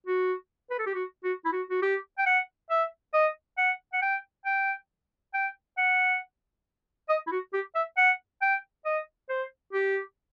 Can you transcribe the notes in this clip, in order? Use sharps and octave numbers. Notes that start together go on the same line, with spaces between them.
F#4
B4
A4
G4
F#4
F#4
E4
F#4
F#4
G4
G5
F#5
E5
D#5
F#5
F#5
G5
G5
G5
F#5
D#5
E4
F#4
G4
E5
F#5
G5
D#5
C5
G4